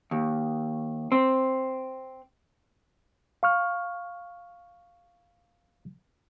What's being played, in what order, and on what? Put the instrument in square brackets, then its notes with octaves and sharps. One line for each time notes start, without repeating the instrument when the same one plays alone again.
[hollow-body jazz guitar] D#2
C4
[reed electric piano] F5 C#6 F6